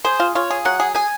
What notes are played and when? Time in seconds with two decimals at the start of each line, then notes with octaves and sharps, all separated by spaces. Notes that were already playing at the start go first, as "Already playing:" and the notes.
0.04 G#4 C5
0.20 F4
0.35 F4 C#5
0.51 G#4
0.65 F#3 F#5
0.80 G#4
0.95 G#4 G#5